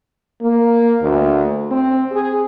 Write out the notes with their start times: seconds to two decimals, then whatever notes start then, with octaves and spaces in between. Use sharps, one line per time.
0.42 A#3
1.02 D2
1.71 C4
2.12 G#4